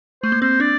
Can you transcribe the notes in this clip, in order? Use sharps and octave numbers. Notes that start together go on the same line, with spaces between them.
A3 C5
A#3
C4 C5
D4 D5